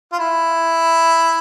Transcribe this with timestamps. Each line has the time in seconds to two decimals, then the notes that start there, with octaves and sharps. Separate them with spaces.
0.12 F4
0.19 E4